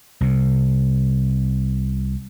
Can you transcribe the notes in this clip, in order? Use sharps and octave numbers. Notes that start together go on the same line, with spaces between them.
C2 C3